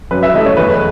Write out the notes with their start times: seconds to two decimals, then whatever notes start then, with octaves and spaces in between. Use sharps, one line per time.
0.11 F#2 B4
0.23 E5
0.33 E3 A3 D#5
0.46 C#5
0.57 E2 B4